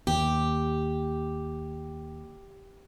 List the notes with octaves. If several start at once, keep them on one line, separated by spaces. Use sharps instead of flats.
D#2 G4